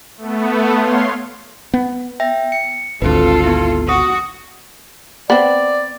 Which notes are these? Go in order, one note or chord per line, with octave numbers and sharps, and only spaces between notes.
A3 B3
C#5 F5 C6
B3
E5 G5 A#6
C#7
G#1 D2 C4 F4 A4 B4
B3 E4
F#4 D#6
B3 C4 D5